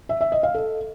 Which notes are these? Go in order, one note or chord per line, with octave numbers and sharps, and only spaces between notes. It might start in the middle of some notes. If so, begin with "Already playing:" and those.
E5
E5
D#5
F5
A4